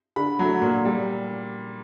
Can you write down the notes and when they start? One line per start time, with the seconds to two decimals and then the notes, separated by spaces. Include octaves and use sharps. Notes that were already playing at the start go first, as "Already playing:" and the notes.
0.16 D3 B5
0.39 F#3 A3
0.62 A#2
0.85 G3